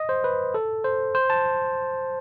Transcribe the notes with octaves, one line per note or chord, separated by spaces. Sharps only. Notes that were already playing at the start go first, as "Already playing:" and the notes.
Already playing: D#5
C5
B4
A4
C5
C5
A5